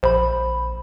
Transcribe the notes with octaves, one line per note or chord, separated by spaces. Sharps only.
A#1 C5 B5